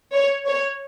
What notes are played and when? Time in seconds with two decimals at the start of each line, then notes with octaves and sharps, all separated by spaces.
0.13 C#5
0.47 C#5